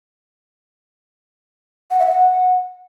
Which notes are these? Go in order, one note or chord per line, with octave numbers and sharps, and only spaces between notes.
F#5
E5
F#5